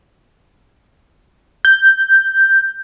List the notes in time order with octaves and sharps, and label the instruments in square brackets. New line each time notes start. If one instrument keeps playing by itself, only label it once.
[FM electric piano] G6